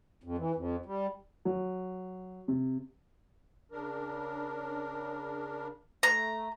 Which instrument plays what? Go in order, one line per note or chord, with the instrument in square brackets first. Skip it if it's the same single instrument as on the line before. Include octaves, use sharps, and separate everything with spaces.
[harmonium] F2
E3
F2
G3
[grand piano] F#3
C3
[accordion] C#3 D4 A#4
[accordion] A3 [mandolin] A#5